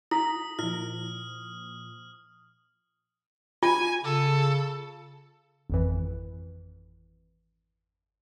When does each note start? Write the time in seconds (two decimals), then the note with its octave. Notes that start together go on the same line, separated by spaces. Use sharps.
0.11 E4 A#5 D#6 B6
0.59 A#2 F3 E4 F6
3.63 F4 G#5
4.04 C#3 A4
5.70 G#1 F2 E3